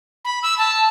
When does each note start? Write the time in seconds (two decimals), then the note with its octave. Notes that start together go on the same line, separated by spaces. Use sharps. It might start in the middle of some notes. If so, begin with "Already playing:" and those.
0.25 B5
0.43 E6
0.58 A5